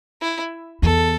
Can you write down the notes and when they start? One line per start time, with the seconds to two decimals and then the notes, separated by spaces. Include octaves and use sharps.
0.21 E4
0.82 E2 A4